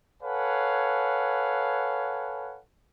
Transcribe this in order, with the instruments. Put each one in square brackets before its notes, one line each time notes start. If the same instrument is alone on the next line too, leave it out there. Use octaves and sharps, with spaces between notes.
[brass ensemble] A4 B4 C#5 F5 F#5 G#5